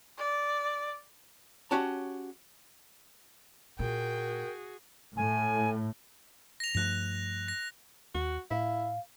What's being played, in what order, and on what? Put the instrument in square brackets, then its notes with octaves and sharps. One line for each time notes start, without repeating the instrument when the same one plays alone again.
[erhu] D5
[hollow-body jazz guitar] C#4 F#4 G4 C#5 A5
[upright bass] A#2 [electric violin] F#4 G#4 [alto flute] A#4 [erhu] G5
[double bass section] A2 [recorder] G#5
[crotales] A#6 F7
[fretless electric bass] G2 F3 A3 [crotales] F#6 A#6
[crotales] A#6
[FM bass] D#2 [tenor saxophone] F#4
[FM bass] A2 [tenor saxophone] E4 [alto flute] F5